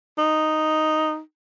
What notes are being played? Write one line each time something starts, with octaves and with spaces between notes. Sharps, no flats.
D#4